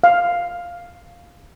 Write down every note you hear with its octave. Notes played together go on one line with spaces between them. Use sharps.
F5